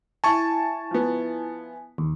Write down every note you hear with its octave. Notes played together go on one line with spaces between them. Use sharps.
E4 G#5 A5 C#6
F3 B3
D#2